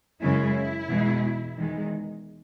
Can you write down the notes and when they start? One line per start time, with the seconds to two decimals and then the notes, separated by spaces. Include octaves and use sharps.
0.22 F#2 C#3 G#3 C#4 E4
0.89 E2 B2 G#3
1.57 E2 D#3 G#3